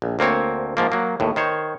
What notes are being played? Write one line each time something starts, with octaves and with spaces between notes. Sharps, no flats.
A#1
D2 A#3 C4 C#5
G#2 F3 A#3
F#3 A#3
D#2 A2
D#3 C5 C#5